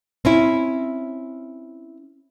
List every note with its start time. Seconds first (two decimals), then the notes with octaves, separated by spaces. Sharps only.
0.25 C4 C#4 E4